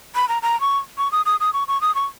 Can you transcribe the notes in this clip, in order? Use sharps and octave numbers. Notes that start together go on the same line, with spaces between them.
B5
A#5
A#5
C#6
C#6
D#6
D#6
D#6
C#6
C#6
D#6
C#6